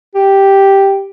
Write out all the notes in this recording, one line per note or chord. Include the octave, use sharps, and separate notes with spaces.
G4